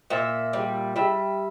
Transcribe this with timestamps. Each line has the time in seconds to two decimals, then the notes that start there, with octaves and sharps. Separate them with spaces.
0.10 A#2 E5
0.53 G3
0.96 G3 E5